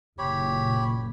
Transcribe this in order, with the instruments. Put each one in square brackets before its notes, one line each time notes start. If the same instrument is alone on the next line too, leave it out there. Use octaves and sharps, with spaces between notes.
[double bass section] F#1 A#2 [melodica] G4 C#5 B5